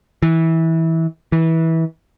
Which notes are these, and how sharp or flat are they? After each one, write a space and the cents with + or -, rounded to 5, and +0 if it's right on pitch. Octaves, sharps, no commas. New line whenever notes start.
E3 -20
E3 -20